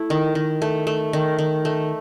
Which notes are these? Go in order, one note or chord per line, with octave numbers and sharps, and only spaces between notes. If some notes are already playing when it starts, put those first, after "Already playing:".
Already playing: A3 E4
D#3
D#3
A3
A3
D#3
D#3
A3